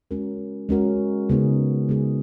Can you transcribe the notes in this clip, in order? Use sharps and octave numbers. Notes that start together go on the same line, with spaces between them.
G#3 C#4 F#4 A#4
G#3 C#4 F#4 A#4
C#3 G#3 B3 D#4 G#4
C#3 G#3 B3 D#4 G#4